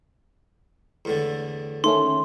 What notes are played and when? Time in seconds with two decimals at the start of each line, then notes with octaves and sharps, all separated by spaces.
1.05 E2 A2 D3
1.84 D#3 A3 C#4 C6